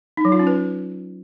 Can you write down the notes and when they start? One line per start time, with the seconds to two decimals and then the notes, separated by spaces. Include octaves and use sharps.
0.17 D#4
0.25 F#3
0.32 F4
0.39 C#4
0.47 B4